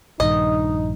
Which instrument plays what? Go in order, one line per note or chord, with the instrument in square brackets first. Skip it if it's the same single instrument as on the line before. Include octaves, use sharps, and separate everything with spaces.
[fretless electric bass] A#1 G2 D#3 [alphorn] D#4 [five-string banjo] D#5